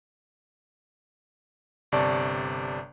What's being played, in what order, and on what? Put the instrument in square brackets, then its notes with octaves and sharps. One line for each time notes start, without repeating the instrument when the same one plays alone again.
[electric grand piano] G1 C3 D5 A5 C#6